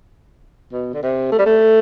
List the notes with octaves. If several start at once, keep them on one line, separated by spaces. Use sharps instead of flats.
B2
D3
C3
A3
G3
A3